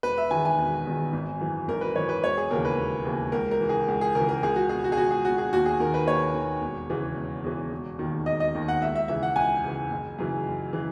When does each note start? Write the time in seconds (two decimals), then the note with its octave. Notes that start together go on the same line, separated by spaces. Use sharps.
0.03 E1 B4
0.18 E5
0.31 E2 D#3 G#5
0.45 G#5
0.59 E1
0.86 E2 D#3
1.13 G#1
1.40 F#2 E3
1.68 G#1 A#4
1.81 B4
1.95 F#2 E3 C#5
2.09 B4
2.24 E1 C#5
2.37 G#4
2.50 D#2 C#3 E3 A#4
2.65 B4
2.77 E1
3.05 D#2 C#3 E3
3.32 C#2 A#4
3.51 A#4
3.60 C#3 E3
3.69 G#4
3.88 C#2
4.01 G#4
4.15 C#3 A#4
4.20 E3
4.29 A#4
4.43 C#2 G#4
4.56 F#4
4.69 B2 G#4
4.84 F#4
4.92 G#4
4.97 C#2 F#4
5.11 G#4
5.25 B2 F#4
5.38 G#4
5.53 D#2 F#4
5.66 G#4
5.80 D#3 A#4
5.94 B4
6.07 D#2 C#5
6.34 D#3
6.62 E1
6.89 E2 C#3 E3
7.16 E1
7.44 E2 C#3 E3
7.72 E1
7.99 D#2 D#3
8.26 E1 D#5
8.40 D#5
8.55 D#2 D#3
8.68 F#5
8.82 C#2 E5
8.96 E5
9.08 C#3 E3 E5
9.23 F#5
9.36 C#2 G#5
9.64 C#3 E3
9.91 F#1
10.19 F#2 C#3 E3
10.46 F#1
10.73 C#3 E3